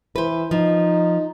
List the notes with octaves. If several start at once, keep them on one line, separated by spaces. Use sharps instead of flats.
E3 B4 C5
F3 D#4